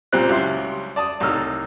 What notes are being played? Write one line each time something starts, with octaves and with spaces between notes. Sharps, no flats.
C#2 A#2 G3 C4 F4 F#6
C#2 F#3 G3 E4 C6
D5 A5 D#6
C2 A2 D#4 E6 F6